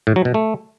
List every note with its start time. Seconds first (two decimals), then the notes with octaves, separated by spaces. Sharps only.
0.07 A2
0.16 F#3
0.25 B2
0.34 A3